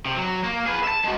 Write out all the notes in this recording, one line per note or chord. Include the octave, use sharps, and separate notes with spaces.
C3
F#3
A#3
G#4 B4
E5 A5
G#3 F#4